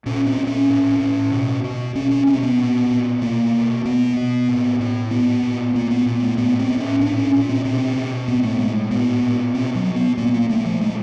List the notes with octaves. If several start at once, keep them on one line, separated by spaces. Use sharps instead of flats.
A#2 C#4
C4
A#2
C#4
A2
A2
B2
B2
B2 C#4
C#4
B2 C4
B3
A#2
A#2
B2 A#3
B2
B2 B3
B2
A2
A2
A#2 B3
A#2
A#2 A#3
B3
A#2
A3
A2 B3
C4
A2
C#4
A#2 D4
C#4
A#2
C4
B2 C4
B2
A2 B3
A3
A2 G#3
A#2 B3
A#2
B2 C4
F#3
B2
B3
A#2 A#3
A#3
A#2 A3
F3
A#2 G#3